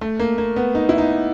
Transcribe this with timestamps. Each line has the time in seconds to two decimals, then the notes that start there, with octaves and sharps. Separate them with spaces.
0.01 A3
0.19 A#3
0.38 A#3
0.56 B3
0.75 D#4
0.89 E4
0.98 D#4